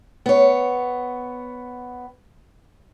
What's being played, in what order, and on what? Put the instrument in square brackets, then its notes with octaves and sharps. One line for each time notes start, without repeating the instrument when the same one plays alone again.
[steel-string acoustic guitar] B3 C#5